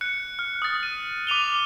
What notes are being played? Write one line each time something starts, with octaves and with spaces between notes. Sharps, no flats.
F#6 C#7
F6
D#6 A6
D#7
D6 D#7 F7 G7